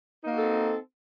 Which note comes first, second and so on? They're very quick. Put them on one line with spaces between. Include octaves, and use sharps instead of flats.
D#4 A#3 F#4 A4 C4